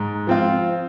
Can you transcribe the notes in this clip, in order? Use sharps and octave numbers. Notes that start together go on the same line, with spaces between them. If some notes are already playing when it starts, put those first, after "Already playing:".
Already playing: G#2
F3 C4 F4